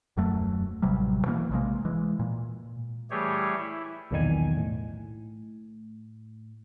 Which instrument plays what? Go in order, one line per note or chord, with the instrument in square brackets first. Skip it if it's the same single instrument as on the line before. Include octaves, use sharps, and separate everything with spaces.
[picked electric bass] D#1 F#2 F#3 A3
A1 C3 F#3 G3
B2 E3 G#3 A#3
A#1 C3 G#3 A#3
E3 G#3
A#2
[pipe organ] E3 G3 A3 G4 G#4 C#5
E4
[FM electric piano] B1 E2 A#2 D3 D#3 G#5
A2